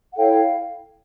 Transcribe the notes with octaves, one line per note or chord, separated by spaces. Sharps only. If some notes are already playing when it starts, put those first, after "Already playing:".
F#5
E4 A4 C#5 F5 G5